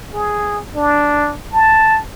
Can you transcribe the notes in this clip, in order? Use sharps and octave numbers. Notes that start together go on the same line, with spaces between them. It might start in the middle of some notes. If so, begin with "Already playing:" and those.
G#4
D4
A5